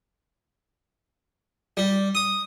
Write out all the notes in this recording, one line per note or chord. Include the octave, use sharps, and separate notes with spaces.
G3
D#6